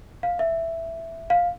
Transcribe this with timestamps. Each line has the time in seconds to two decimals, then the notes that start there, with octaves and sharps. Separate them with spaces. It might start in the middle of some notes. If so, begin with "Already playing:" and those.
0.23 F5
0.39 E5
1.30 F5